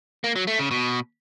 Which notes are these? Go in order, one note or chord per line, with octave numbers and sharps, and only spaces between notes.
A#3
F#3
A3
C#3
B2